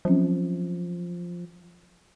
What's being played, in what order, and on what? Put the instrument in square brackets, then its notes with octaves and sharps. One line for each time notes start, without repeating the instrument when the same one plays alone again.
[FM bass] F3 [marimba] F#3 C4 C#4